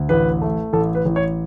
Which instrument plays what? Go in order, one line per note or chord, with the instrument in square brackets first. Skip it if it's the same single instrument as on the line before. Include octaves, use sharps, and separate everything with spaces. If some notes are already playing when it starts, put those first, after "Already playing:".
Already playing: [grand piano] D2
A1 B4
A3
A1 A4
B4
A1
C#5